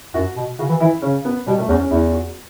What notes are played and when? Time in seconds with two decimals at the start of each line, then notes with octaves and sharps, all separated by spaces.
0.14 F#2 F#4
0.36 B2
0.59 C#3 F#4
0.69 E3
0.80 E3 E4
1.02 C#3 C#4
1.25 B3
1.46 B2 G3
1.58 A3
1.69 E2 C#4
1.80 C#4
1.91 E2 E4
2.13 F#4